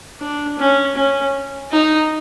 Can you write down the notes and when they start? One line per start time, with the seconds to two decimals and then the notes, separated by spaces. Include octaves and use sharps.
0.20 D4
0.59 C#4
0.96 C#4
1.71 D#4